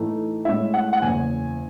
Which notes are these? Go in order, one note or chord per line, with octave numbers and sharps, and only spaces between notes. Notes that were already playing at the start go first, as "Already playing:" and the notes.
Already playing: A2 E3 A3 D#4
A2 G#3 C#4 E4 E5
F#5
F#5
F#1 E2 C#3 G#5